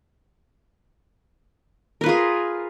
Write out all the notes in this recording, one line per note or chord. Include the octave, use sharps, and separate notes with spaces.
F4 G#4 A#4 B4